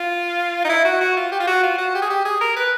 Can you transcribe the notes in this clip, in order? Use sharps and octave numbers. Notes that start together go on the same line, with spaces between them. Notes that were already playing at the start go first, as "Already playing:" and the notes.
Already playing: F4
D#4
E4
F#4
F#4
F4
G4
F4
F#4
F4
F#4
G4
G#4
G4
G#4
A#4
B4